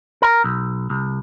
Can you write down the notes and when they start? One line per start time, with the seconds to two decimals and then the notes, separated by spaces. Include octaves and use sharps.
0.22 A#4
0.44 B1
0.90 C2